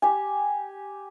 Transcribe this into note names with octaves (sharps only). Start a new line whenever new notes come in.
G4 G#5